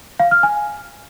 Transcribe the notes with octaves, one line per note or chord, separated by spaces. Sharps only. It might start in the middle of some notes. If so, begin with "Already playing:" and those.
F5
F6
G#5